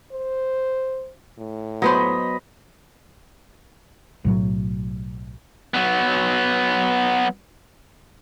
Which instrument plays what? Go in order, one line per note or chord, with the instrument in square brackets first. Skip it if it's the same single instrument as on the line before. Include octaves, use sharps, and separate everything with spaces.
[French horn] C5
A2
[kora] F#3 B3 C5 [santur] D#5 B5
[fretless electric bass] B1 A2 F#3
[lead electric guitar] F#3 B3